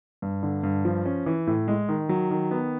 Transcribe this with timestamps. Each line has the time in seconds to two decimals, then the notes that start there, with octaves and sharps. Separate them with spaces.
0.22 G2
0.43 D3
0.63 G2
0.85 F3
1.06 C#4
1.26 E3
1.47 A2
1.68 G#3
1.89 D#3
2.09 F#3
2.31 D#3
2.51 B3